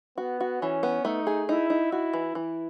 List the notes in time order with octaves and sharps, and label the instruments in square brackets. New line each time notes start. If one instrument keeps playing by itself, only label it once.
[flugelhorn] B3 [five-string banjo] F#4
[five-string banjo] F#4
[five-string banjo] E3 [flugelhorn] C#4
[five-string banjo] B3
[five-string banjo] A3 [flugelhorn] D#4
[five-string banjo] G#4
[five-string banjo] D#4 [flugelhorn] E4
[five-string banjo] D#4
[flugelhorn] E4 [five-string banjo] F#4
[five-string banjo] E3
[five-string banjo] E3 [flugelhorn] E4